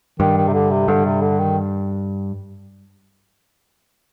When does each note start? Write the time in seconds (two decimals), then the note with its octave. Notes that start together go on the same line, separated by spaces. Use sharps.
0.20 G2 D#3
0.37 D#3
0.48 C3
0.53 D3
0.71 C3
0.88 G2 D3
1.06 C3
1.22 D3
1.39 D#3